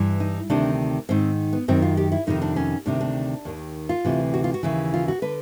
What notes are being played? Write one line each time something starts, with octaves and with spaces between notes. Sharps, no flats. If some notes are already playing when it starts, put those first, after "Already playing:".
Already playing: G2 E3
D#4
D2 C3 D#3 D4
G#2 D#3 C4
B3
F#2 D#3 C4
F4
G4
E4
F2 C3 D#3 D#4
D4
C#4
D2 C3 D#3 D4
D4
D#2 D#3
F4
D2 C3 E3
F#4
F4
F#4
D#2 C#3 E3
F4
F#4
D3 B4